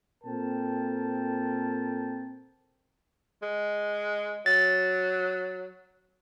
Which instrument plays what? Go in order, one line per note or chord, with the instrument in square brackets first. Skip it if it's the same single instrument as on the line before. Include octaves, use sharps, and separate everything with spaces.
[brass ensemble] A#2 C4 A4 A#4 G5 A5
[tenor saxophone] G#3
[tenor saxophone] F#3 [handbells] A6